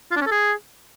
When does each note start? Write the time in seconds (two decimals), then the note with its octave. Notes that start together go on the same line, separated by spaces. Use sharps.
0.11 F4
0.16 D4
0.21 C#4
0.26 A4
0.31 G#4